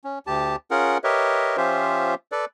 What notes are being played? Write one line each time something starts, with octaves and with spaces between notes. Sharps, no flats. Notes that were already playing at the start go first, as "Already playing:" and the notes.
C#4
D2 G4 A5
C#4 F4 G#4 A#4 F#5
G4 A#4 B4 C#5 D#5 E5
F3 C#4 F4 G4 C5 E5
A4 B4 D5